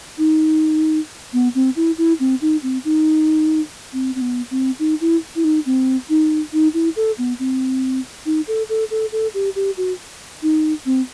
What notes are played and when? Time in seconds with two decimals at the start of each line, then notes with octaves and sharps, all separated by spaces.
0.18 D#4
1.33 B3
1.55 C4
1.76 E4
1.98 E4
2.20 C4
2.41 D#4
2.63 C4
2.85 D#4
3.93 C4
4.15 C4
4.22 B3
4.51 C4
4.79 D#4
5.01 E4
5.36 E4
5.44 D#4
5.66 C4
6.10 D#4
6.53 D#4
6.74 E4
6.96 A4
7.18 B3
7.39 C4
8.26 D#4
8.48 A4
8.69 A4
8.91 A4
9.12 A4
9.34 G4
9.56 G4
9.77 F#4
10.43 D#4
10.86 C4